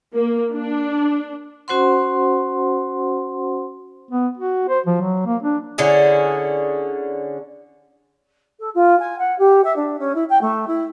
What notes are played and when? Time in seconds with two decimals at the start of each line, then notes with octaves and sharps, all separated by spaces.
0.15 A#3
0.53 D4
1.68 C#4 F#4 C5 F#5 C6
4.11 B3
4.37 F#4
4.69 C5
4.86 F3
5.01 F#3
5.26 A#3
5.43 D4
5.78 D3 C#4 E4 G#4
8.60 A4
8.75 F4
9.00 G#5
9.19 F#5
9.39 G4
9.64 E5
9.76 D4
9.99 C#4
10.15 E4
10.29 G5
10.41 A3
10.67 E4